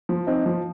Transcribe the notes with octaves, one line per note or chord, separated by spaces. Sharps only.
F3
C4 D#4
F3